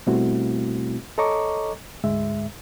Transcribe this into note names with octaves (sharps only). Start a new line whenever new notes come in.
B2 G3 A3 C4 E4 F#4
A4 C#5 D#5 A#5 C#6 D6
D2 G#2 G#3 E5